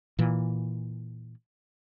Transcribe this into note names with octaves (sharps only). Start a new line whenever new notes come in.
A#2 E3